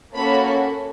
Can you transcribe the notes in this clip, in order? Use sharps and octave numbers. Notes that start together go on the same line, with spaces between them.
A#3 C#4 F#4 A4 B5